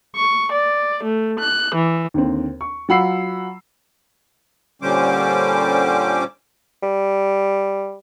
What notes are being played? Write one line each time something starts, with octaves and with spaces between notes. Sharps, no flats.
C#6
D5
A3
F#6
E3
D#2 D3 C4
C#6
F#3 F4 F#5 B5 E6 C7
A#2 D3 G3 C#4 C5 D6
G3